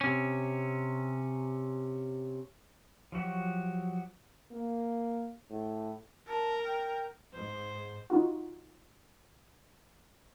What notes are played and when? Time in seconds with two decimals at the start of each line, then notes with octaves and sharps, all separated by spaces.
0.01 C3 C#4
3.12 F3 F#3 F#4 G4
4.52 A#3
5.50 A2
6.28 A#4 A5
6.64 G5
7.33 G#2 C5
8.10 E3 D#4 F4 F#4